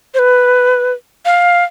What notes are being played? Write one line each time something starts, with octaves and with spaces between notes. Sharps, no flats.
C5
B4
F5